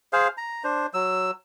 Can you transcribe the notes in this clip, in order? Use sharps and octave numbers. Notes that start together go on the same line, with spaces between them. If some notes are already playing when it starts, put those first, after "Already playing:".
G#4 C5 F5
A#5
D4 C5
F#3 E6